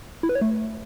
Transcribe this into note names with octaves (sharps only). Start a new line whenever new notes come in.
E4
B4
C#5
A3